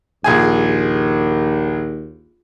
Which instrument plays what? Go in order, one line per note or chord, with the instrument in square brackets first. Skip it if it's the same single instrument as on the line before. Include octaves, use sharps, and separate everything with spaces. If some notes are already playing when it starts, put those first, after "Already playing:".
[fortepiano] A#1 G#4 G#5 [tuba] D#2